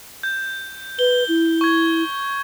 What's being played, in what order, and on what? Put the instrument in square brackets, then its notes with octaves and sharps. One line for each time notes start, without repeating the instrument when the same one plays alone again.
[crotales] G6
[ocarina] B4 [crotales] G7
[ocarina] E4
[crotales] C#6 G#6